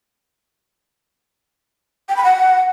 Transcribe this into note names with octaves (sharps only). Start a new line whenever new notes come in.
G5
B5
F#5